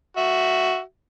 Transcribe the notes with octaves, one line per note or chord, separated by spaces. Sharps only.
F#4 E5